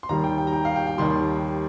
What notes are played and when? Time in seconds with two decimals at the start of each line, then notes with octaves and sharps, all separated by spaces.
0.03 C6
0.09 D#2 D#3 G3 A#5
0.24 G5
0.38 G5
0.47 A#5
0.53 G5
0.65 F5
0.76 G5
0.87 G5
0.98 D#2 D#3 G3 C6